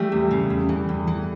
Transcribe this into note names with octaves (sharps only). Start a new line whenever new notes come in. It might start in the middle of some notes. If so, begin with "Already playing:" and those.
Already playing: E3 G3 A3
E2
C#3
E2
E3
E2
E3